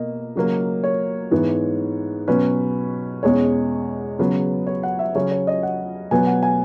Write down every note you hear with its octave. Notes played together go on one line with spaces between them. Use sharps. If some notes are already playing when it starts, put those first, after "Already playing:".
Already playing: B2 A#3 D#5
C#3 F#3 A#3
C#5
G#2 E3 B3
B2 F#3 C#4 B4
E2 B2 G#3 C#4 C#5
C#3 F#3 B3 B4
C#5
F#5
E5
C#3 F#3 C#4 C#5
C#5
D#5
F#5
B2 F#3 B3 G#5
F#5
G#5